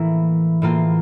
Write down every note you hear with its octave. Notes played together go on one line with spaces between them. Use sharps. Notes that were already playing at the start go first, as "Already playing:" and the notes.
Already playing: A2 E3 A#3 E4
A2 E3 A#3 F4